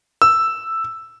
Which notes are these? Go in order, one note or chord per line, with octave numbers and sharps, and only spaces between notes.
E6